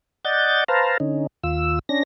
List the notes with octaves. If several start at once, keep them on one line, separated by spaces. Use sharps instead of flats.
D5 D#5 F#5 G6 A6
B4 C5 F5 A5 A#5
D3 C#4 D#4
D#2 F4 E6
C#4 D4 A#6